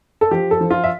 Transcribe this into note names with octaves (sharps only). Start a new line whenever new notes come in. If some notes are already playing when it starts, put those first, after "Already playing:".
A4
F3 G4
A4
F3
F4
E5